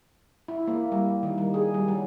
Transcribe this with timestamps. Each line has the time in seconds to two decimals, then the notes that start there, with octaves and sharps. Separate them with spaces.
0.48 E4
0.68 A#3
0.92 G3
1.23 D#3
1.38 G3
1.54 G#4
1.74 G3
1.88 F#3